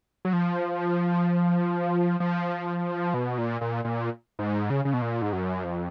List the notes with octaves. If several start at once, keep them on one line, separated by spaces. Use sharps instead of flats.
F#3
F3
F3
B2
A#2
A#2
A#2
G#2
C#3
C#3
B2
A#2
G#2
F#2
F2